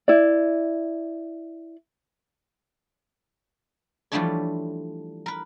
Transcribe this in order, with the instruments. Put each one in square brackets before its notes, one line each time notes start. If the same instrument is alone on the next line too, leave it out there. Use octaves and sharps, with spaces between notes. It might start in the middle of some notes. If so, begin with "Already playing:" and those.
[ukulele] E4 D5
[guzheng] E3 F3 G3 A3 D4 C#5
A#4 B4